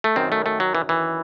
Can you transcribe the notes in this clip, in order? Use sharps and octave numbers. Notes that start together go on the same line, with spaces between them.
A3
F#2 D#3 C4
A3
A3
F#3
E3
E3